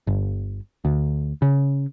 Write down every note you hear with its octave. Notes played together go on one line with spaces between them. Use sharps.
G1
D2
C#3